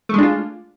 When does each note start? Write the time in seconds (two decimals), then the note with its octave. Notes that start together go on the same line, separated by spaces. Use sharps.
0.09 A3
0.14 G#3
0.18 D4
0.23 F4